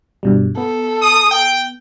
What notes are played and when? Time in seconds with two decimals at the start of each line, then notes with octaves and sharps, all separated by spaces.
0.23 G2 B2 G3
0.57 B3 A4
1.02 D#6
1.31 G5